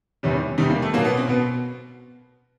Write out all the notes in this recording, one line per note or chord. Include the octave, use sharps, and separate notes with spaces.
E2 C3 D#3 G3 C#4
E2 C3 D#3 G3 D#4
A#3
A3
B2 F#3 A#3
B3
C4
B2 B3